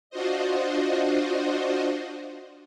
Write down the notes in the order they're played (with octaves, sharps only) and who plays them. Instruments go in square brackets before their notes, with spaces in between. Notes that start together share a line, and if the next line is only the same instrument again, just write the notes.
[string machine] D4 F4 F#4 C5 D#5